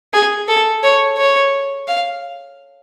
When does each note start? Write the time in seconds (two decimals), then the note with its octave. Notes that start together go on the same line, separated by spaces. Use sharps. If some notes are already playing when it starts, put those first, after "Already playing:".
0.13 G#4
0.48 A4
0.83 C#5
1.18 C#5
1.88 F5